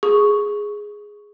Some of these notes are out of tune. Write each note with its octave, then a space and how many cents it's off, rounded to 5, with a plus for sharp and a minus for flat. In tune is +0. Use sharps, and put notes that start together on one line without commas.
G#4 +0 C#6 +0